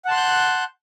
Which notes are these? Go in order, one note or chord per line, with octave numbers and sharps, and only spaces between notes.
F#5 A5 C6 F#6 G6